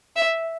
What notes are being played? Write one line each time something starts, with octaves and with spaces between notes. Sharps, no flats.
E5